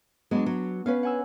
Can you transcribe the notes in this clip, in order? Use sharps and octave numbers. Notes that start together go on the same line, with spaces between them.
F#3 G#3 B3 D4
F#3
B3 C#4 B4 F5
F#5 G#5 E6